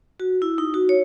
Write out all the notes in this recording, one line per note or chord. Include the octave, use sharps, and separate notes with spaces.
F#4
E4
D#4
F#4
C#5